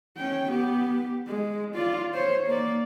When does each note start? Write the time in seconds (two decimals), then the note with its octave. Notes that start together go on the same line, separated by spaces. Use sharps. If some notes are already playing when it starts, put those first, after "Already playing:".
0.17 C#4 G5
0.49 B3 G4
1.27 G#3
1.75 F4 D5
2.14 C5 C#5
2.47 A#3 D5